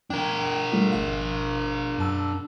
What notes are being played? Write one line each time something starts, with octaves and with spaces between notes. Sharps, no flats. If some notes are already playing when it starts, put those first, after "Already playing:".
D4 A#4 G5 G#6
G3 A3 F4
G#1 F5
F#2 A5 E6